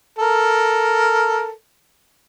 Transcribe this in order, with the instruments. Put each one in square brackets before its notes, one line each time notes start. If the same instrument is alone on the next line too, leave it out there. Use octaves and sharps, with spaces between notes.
[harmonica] A4 A#4